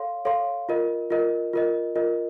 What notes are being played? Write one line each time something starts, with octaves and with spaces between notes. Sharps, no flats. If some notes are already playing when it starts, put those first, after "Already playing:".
Already playing: A4 C#5 F5 C6
A4 C#5 F5 C6
F4 A#4 D#5
F4 A#4 D#5
F4 A#4 D#5
F4 A#4 D#5